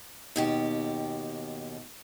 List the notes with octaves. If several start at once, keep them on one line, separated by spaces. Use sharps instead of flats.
D#2 B2 G4